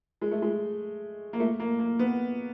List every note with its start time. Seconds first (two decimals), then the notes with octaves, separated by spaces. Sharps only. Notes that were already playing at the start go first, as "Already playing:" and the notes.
0.22 G#3
0.31 A3
0.42 G#3
1.33 A#3
1.40 A3
1.60 A#3
1.79 A#3
1.99 B3